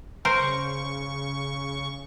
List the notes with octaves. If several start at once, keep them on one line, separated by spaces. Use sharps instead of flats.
C#3 A#4 C5 C#6